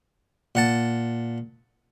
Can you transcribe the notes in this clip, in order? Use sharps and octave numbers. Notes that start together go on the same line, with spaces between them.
A#2 F#5 A5